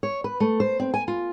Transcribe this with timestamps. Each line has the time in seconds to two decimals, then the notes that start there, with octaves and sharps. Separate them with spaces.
0.03 C#5
0.24 B4
0.40 A3
0.60 C5
0.80 C4
0.94 G#5
1.08 F4